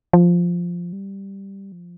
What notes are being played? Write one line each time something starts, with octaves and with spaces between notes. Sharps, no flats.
F3
G3
F3